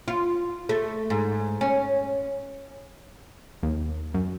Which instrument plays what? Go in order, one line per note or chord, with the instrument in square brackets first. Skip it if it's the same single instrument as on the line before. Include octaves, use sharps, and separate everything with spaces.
[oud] F4
A3
G#2
C#4
[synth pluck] D#2
F#2